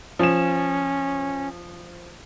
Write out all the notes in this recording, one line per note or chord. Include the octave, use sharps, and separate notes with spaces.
F3 C#4 E7